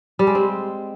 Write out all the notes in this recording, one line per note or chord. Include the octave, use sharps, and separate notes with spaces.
G3
G#3
C4